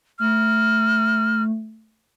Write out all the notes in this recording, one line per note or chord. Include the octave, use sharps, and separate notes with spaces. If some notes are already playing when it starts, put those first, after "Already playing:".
A3 F6